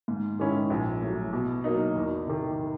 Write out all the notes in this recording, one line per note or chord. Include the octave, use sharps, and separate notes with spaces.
G#2
D#3 G#3 C#4 E4
A#1
A2 F#3
B2
F#3 A#3 D#4
E2
C3 D#3